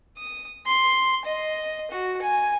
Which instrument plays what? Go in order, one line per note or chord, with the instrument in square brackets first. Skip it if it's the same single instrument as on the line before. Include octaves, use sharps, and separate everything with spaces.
[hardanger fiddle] D#6
C6
D#5
F#4
G#5